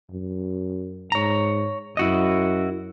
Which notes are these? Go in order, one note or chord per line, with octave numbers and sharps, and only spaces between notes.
F#2
G#2 C#5 A#5
F#2 E4 F#4 D#5